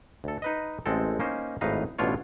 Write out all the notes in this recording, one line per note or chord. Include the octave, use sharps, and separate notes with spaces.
D2 A4
D#4 B4 D#5
A1 G#3 C4 A4
A#3 C#4 D#4 C5
G#1 A2 D#4 B4 F5 A#5
A1 B2 D4 F4 C#5